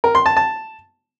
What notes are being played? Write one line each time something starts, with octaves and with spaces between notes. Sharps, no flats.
A#4
C6
A5
A5